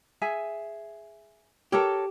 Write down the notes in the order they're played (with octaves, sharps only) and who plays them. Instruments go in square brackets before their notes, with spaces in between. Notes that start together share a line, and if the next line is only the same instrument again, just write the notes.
[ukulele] G#4 E5 G#5
[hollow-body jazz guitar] G4 [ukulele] A4 A#4 C#5